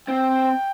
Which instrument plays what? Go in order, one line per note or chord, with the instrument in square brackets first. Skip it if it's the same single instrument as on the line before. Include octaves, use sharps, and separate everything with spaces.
[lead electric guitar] C4 [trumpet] G5